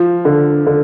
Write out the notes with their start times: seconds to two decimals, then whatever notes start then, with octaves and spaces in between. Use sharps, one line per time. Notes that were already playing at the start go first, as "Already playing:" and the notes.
Already playing: F3
0.25 D3
0.67 D3